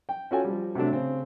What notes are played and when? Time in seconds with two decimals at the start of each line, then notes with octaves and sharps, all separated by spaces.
0.09 G5
0.31 C#4 F4 F#4 A4 G5 G#5
0.44 F3 G3
0.75 C3 F#3 A3 D4
0.92 C#3 C4